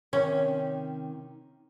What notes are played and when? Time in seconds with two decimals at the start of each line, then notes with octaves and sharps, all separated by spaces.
0.13 C3 D#3 C#4